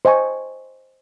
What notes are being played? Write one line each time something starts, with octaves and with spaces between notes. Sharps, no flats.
C5 D#5 G#5 C#6